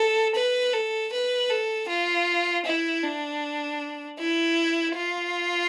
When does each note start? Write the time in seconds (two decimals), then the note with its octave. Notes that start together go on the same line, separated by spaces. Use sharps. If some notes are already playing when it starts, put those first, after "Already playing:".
Already playing: A4
0.36 B4
0.73 A4
1.12 B4
1.50 A4
1.89 F4
2.66 E4
3.03 D4
4.19 E4
4.96 F4